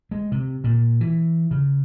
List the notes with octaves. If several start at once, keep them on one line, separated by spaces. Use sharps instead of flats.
G#3
C3
A#2
E3
C#3